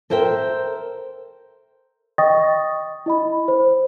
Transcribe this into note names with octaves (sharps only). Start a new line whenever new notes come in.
A4 A#4 C5 E5 G5
D#5 G5 C#6 D#6 A6 A#6
E4 D#5 B5
C5